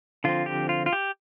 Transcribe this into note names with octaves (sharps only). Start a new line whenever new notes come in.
D3 F3 C4 F4
G4
F4
F4
G4